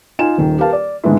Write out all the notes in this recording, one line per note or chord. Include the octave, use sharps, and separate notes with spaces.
D#4 F4 G#5 E7
D#1 D#3
G4 A#4 B4 F5 A5
D5
G#2 D3 D#3 G#3 B3 E4